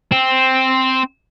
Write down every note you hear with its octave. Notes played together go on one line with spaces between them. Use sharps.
C4